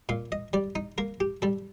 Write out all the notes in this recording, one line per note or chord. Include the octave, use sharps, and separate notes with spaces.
A#2 F5
D#5
G3 D5
D#4
A#3 A#4
G4
G3 A4